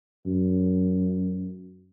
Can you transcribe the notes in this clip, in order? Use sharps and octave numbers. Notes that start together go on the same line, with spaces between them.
F#2